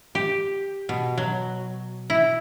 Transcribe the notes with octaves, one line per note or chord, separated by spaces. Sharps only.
G4
B2
F#3
E4